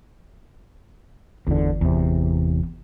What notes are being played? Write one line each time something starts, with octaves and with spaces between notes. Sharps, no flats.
G1 E2 D3
E2 C3